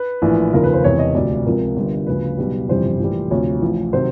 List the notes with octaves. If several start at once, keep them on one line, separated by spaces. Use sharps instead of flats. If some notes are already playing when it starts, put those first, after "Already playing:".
Already playing: B4
A#1 A2 E3
F1 D#2 C#3 F3 A#4
B4
C5
E1 E2 C3 E3 C#5
D#5
D2 C3 F3 D5
C#2 C3 F3 A#4
G1 G2 D3 G3
D2 C#3 F3 B4
B1 B2 G3
G1 F2 C3 E3 G3 C5
A#1 A2 E3 G3
D2 C3 F3 C#5
A1 A2 F3
C3 D#3 F#3 C5